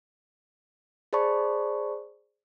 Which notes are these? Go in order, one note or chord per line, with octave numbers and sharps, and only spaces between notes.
G#4 C5 D5 A5 B5 C#6